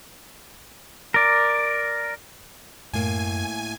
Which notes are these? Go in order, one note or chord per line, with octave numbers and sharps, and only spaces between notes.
A#4 D5
F#2 A2 A#3 G#5